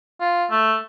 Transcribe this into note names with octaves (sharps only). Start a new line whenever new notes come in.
F4
A3